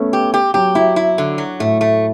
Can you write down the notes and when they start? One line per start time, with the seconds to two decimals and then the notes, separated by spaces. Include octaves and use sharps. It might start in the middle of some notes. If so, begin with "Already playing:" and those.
Already playing: A3 B3 C#4
0.13 G4
0.34 G4
0.54 F#3 G4
0.75 F#3 E4
0.96 E4
1.18 D3
1.38 F#3
1.60 A2 A3
1.81 A3